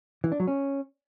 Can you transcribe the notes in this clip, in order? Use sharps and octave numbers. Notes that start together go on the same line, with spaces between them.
E3
D4
F#3
C#4